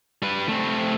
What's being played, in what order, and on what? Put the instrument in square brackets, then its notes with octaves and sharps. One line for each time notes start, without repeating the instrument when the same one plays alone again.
[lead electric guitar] G3 B4
A3 C4